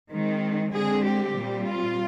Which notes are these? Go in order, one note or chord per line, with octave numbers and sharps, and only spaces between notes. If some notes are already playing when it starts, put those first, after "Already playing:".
D#3 G#3 C4
D3 G#3 C4 G#4
G4
A#2 G3 C4
F4